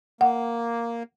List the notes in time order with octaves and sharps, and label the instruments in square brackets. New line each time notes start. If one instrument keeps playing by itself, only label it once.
[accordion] A#3 [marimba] F#5